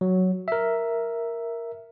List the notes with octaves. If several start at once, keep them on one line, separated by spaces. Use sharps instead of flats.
F#3
A#4 E5